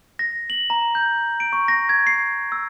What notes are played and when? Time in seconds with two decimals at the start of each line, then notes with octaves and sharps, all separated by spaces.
0.19 A#6
0.50 F#7
0.70 A#5
0.95 G6
1.40 D7
1.53 C#6
1.68 A#6
1.89 G#6
2.07 C7
2.52 E6